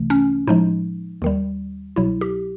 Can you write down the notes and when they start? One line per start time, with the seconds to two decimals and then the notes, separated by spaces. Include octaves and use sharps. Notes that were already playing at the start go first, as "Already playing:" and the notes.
Already playing: C2 C3 E3 A3
0.10 C#4
0.47 A2 F3 G#3 D#4
1.22 D#2 D#3 G3
1.96 C2 B2 F#3 E4
2.21 G4